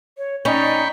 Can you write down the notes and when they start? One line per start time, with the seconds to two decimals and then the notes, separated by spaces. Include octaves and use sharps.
0.18 C#5
0.45 C#4 D#4 D5 G5 B5 C#6